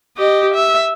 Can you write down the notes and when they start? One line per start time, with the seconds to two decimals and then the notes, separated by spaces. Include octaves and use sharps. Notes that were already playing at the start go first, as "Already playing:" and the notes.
0.17 G4 D#5
0.54 E5